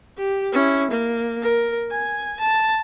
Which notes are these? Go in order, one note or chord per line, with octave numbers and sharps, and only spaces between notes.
G4
C#4 E4
A#3
A#4
G#5
A5